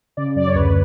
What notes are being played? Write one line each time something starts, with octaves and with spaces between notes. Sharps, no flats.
C#3 D5
F#2 D5
C#5
D2 B4